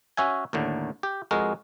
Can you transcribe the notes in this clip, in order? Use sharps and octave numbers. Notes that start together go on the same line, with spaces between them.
C#4 F#4 E5 G#5
D#2 A2 D3
G4
F2 G#3 F#4 A#4